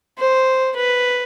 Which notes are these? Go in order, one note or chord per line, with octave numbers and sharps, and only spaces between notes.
C5
B4